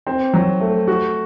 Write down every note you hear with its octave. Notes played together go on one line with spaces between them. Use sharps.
C4
F#3
A3
F#4